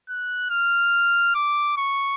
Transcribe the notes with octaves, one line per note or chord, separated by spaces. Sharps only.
F#6
F6
D6
C#6